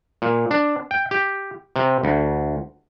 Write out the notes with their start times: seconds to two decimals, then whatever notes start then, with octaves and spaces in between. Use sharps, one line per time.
0.22 A#2
0.51 D4
0.91 G5
1.11 G4
1.76 C3
2.03 D2